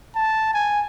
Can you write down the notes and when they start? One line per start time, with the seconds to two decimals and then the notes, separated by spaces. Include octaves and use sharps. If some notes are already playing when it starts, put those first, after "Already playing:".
0.15 A5
0.54 G#5